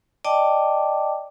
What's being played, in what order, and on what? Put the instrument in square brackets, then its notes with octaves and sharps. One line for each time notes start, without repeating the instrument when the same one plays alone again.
[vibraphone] D5 D#5 G5 A5 D6